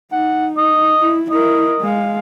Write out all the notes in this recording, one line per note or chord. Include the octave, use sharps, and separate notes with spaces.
D#4 F#5
D#5
E4
E4 A#4 D#5
G#3 F5